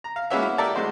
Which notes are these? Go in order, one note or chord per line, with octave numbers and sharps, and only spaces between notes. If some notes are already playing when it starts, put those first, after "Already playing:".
A#5
F5
G#3 A#3 B3 C#4 F#4 E5
E4
G4 A4 A#4 D5 E5 A5
G#3 A3 F#4 C5 D#5